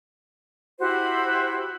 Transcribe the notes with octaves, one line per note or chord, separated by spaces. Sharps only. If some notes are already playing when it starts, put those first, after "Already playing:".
E4 F#4 G4 C5